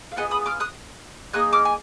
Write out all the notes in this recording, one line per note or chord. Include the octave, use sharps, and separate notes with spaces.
F5
B3 F4 G#4 D#5 F#5
B5 D#6
D6 F6
D#6 F#6
A#3 D#4 G#4 D#6 F#6
D6 F6
G#5